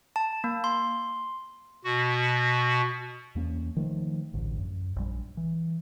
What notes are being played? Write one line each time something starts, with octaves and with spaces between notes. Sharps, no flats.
A5
A#3
C6
B2 F#4
E2 A#3 C4 C#4
D#3 F3 A3
A1 D2 G2
F#2
A#1 G3
E3